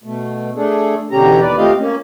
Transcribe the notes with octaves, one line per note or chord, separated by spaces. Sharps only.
B2 A3
A3 D4 G#4 A4
E2 B2 D3 C#4 G4 A#5
D#2 B4 D5
A3 C4 F4 G4 D#5 F5
A#3 C#4